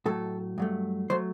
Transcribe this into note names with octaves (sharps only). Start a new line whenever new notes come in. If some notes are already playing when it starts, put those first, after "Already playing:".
A2 F#3 A3 A4
G2 F#3 A3
F#3 A3 C5